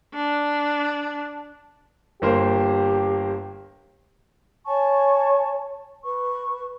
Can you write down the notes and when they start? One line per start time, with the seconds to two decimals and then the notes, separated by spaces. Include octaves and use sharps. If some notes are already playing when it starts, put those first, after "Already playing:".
0.14 D4
2.22 G1 A#3 G4 C5
4.66 C#5 G#5 A5 C#6
6.03 B4 C#6